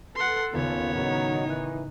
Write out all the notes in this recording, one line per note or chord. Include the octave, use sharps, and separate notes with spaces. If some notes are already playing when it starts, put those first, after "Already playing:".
A4 B4 F#5 C6
G#1 D#2 C#3 B3 F4 C#5
A2 D#3 F#3 D#4
E3 F#6 D#7